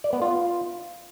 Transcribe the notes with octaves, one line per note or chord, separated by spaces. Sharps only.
D5
B3
F4